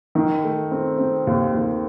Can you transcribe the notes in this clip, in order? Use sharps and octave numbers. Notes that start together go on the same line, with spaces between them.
D#3
A3
C4
C4
D#2
D#2